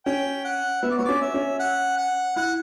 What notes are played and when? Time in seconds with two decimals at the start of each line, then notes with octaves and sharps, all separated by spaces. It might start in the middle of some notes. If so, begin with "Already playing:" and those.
0.06 C#4 G5
0.45 F#5
0.83 B3 E5
0.90 D5
0.98 B3 C#5
1.05 C#4 D5
1.21 E5
1.34 C#4
1.59 F#5
1.97 F#5
2.36 E4 F#5